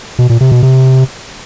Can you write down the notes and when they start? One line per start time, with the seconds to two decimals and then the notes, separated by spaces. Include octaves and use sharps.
0.19 B2
0.30 A#2
0.41 C3
0.52 B2
0.63 C3